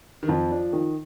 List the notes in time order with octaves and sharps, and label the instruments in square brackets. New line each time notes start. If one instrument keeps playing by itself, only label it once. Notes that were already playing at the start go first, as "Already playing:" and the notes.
[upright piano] D#3
[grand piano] F2 [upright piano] F3
[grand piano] D4
D#3